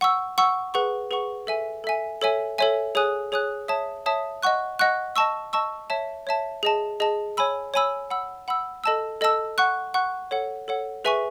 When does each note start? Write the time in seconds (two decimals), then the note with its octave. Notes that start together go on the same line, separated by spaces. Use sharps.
0.01 F#5 C#6 E6
0.38 F#5 C#6 E6
0.74 G#4 B4 F#5 C#6
1.11 G#4 B4 F#5 C#6
1.47 A4 E5 G#5
1.84 A4 E5 G#5
2.21 A4 C#5 E5 G#5
2.58 A4 C#5 E5 G#5
2.95 G#4 C#5 G#5 D#6 F#6
3.32 G#4 C#5 G#5 D#6 F#6
3.68 C#5 E5 A5 D#6
4.06 C#5 E5 A5 D#6
4.43 D#5 F#5 C#6 F#6
4.79 D#5 F#5 C#6 F#6
5.16 D#5 A5 C#6 E6
5.53 D#5 A5 C#6 E6
5.90 C#5 E5 A5
6.27 C#5 E5 A5
6.63 G#4 D#5 A5
7.00 G#4 D#5 A5
7.37 C#5 G#5 B5 E6
7.74 C#5 G#5 B5 E6
8.10 F#5 B5 E6
8.48 F#5 B5 E6
8.84 A4 D#5 A5 E6
9.21 A4 D#5 A5 E6
9.58 F#5 C#6 F#6
9.94 F#5 C#6 F#6
10.31 A4 C#5 F#5
10.68 A4 C#5 F#5
11.05 G#4 B4 E5 G#5 C#6